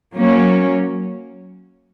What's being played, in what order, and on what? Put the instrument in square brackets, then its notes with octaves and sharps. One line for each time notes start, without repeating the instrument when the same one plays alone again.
[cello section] F#3 A#3 C#4